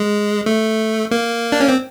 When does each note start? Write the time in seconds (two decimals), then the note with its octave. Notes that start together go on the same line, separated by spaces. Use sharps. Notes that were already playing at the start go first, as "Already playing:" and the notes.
Already playing: G#3
0.46 A3
1.11 A#3
1.52 D4
1.60 C#4
1.69 C4